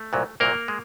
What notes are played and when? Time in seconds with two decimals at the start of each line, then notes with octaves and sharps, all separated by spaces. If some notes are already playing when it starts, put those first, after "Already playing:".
Already playing: A3
0.13 C2 A#2 F#3
0.40 C2 A#2 F#3 A#3 A#4
0.68 G#3